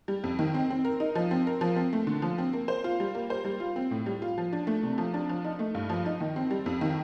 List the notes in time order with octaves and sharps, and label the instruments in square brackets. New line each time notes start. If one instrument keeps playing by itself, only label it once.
[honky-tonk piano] G3
F2
D#3
C4
C4
A#4
D#4
F3
C4
A#4
F3
C4
A3
D3
F3
C4
A#3
C5
F4
G3
A#3
C5
G3
F4
C4
A2
G3
F4
F3
D4
A3
C3
F3
D4
F3
D#4
A3
G2
F3
D#4
D#3
C4
G3
F2
D#3